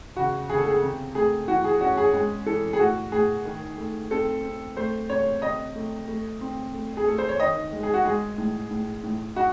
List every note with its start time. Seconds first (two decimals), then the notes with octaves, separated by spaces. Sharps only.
0.16 C#3 F#4
0.50 C#3 G#4
0.58 A4
0.68 G#4
0.82 C3
1.15 A3 G#4
1.48 E3 F#4
1.64 G#4
1.81 C#4 F#4
1.97 G#4
2.14 G#3 G#4
2.46 E3 A4
2.73 G#4
2.79 A2 F#4
3.12 A2 G#4
3.45 D#3
3.78 A3
4.11 C4 A4
4.43 C4
4.77 A3 C5
5.10 C3 C#5
5.42 C3 D#5
5.75 A3
6.08 A3
6.41 C4
6.74 A3
6.97 G#4
7.06 A3 A4
7.18 C5
7.29 C#5
7.39 D#3 D#5
7.73 G#3
7.83 G#4
7.94 F#4
8.05 G#3 G#4
8.38 A2
8.71 A2
9.03 A2
9.36 D#4 F#4